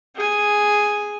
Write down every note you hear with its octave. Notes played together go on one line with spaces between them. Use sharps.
G#4 G#5